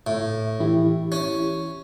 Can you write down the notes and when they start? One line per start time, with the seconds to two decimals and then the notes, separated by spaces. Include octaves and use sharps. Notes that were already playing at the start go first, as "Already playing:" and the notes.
0.07 A2
0.60 E3 E4 G4
1.12 C#4